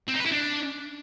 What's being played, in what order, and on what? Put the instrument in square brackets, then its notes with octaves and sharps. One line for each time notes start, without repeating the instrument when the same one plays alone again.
[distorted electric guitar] C4
D#4
B4
E4
D4